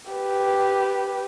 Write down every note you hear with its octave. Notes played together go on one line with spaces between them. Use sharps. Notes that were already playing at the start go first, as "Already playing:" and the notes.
G4 B4